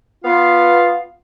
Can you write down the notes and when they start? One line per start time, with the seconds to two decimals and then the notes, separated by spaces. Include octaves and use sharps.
0.25 B3 F4 F5